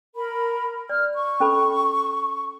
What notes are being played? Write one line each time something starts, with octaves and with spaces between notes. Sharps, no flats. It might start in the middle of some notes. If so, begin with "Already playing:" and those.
A#4 B5
D5 F6
C#6
C#4 A4 B5